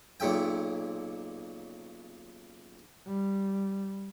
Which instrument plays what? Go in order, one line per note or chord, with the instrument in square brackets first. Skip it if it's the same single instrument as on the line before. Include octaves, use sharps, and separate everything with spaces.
[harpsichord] B1 A#2 C#3 E5 G5
[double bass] G3